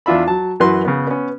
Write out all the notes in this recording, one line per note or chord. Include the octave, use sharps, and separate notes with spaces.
E2 D4 F4 E5 B5
F#3 A5
F#2 E3 F#4 B4 C6
C#3 B3
B3 C#4